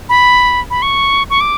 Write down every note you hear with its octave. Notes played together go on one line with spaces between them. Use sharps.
B5
B5
C#6
C#6
D6